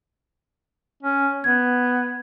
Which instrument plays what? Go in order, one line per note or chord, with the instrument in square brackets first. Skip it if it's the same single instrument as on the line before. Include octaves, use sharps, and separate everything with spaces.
[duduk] C#4
[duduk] B3 [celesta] G#6